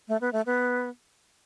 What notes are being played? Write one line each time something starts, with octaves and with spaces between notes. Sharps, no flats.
A3
B3
A3
B3